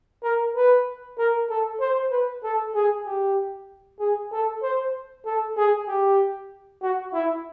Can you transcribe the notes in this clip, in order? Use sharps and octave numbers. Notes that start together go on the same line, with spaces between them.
A#4
B4
A#4
A4
C5
B4
A4
G#4
G4
G#4
A4
C5
A4
G#4
G4
F#4
E4